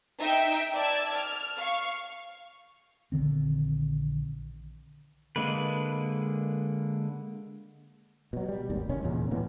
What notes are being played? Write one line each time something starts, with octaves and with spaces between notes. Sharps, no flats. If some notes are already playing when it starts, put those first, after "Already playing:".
D#4 E5 G5
D5 A5 E6 G#6
F6
F5 C#6
A#1 D3 D#3 C4
D3 G#3 A#3 B4
B2 F#3
G3
G#1 D#2
E1 C2 D#3 C#4
E2 A#2 C#3
D2 A2 E3 B3